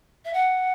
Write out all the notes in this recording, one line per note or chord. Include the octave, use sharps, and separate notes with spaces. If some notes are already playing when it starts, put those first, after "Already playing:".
E5
F#5